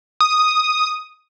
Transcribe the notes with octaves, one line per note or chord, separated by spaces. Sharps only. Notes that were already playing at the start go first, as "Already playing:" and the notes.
D#6